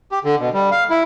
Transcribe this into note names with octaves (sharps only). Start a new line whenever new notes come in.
G4
D3
B2
G3
F5
E4